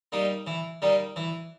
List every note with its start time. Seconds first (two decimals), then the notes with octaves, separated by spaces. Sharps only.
0.12 G3 A#3 D#4
0.47 E3
0.82 G3 A#3 D#4
1.16 E3